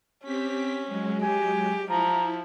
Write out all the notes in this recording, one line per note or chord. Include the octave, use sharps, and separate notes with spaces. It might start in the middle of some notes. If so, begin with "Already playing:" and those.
C4 C#4 G4 B6
F#3 G#3
G4 G#5
F3 E4 A#5